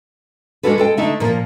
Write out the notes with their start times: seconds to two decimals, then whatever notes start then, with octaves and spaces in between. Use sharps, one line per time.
0.63 G#3 C#4 D4 F#4 A4 B4
0.78 G#3 A4 G5
0.97 D3 A3 D#4 E5
1.20 A#2 F3 A#3 A#4